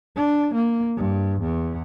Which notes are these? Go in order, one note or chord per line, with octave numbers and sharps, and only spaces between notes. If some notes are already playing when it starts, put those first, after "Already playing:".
D4
A#3
G2
E2